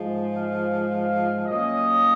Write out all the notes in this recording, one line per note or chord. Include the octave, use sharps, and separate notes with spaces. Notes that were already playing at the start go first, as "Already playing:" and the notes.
Already playing: G#2 F3 G#3
F5
F5
A#2 F#3 A#3 C#4 D#5